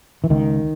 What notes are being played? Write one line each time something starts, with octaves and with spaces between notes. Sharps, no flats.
E3
C#2 D#3